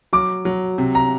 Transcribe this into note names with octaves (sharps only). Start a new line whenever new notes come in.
F#3 D6
F#3
C3
A#5